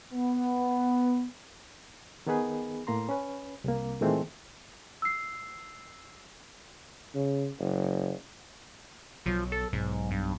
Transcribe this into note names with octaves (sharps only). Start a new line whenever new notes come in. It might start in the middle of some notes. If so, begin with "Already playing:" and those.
B3
D#3 B3 D#4 G#4 B4
A2 A#3 A#5 C6
C#4 B4
C2 A#3
A#2 D#3 E3 G#3 A3 C4
E6 C7
C#3
F#1
B1 F3 F#3
A4
B1 G#2
G2